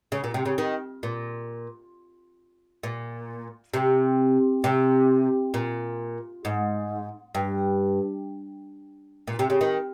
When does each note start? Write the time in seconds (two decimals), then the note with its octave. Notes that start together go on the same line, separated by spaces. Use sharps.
0.12 C#3
0.24 A#2
0.34 C3
0.46 C#3
0.58 D#3
1.03 A#2
2.83 A#2
3.74 C3
4.64 C3
5.54 A#2
6.45 G#2
7.35 G2
9.27 A#2
9.39 C3
9.50 C#3
9.61 D#3